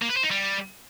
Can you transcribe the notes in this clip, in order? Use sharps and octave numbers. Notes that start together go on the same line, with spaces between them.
A#3
B4
C5
D#4
G3